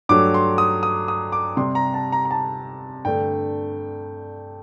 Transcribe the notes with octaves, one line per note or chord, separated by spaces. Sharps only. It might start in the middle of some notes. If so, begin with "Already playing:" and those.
G2 F#3 A3 D6
C6
D#6
D#6
D#6
D6
C3 G3 C6
A#5
A5
A#5
A#5
A5
G2 D3 A3 G5